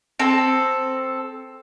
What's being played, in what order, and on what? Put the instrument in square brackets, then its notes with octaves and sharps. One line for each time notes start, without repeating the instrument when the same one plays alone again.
[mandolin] C4 A4